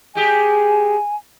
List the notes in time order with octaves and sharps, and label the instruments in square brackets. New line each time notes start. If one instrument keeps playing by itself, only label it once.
[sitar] G#3 G4 G#4 [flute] G#5